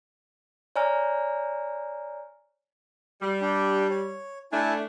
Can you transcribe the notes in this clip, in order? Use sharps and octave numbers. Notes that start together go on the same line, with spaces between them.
C#5 D5 G#5 A#5 F6
G3
D4 G5
C#5
A3 D4 E4 G#5 A5